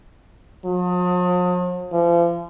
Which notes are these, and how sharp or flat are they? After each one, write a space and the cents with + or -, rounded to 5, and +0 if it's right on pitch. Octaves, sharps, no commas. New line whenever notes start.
F3 +45
F3 -35